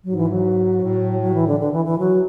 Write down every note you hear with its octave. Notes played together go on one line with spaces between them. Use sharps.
G#2 F#3
E3
F#3
A2
F#3
E3
D3
D3
E3
E3
F#3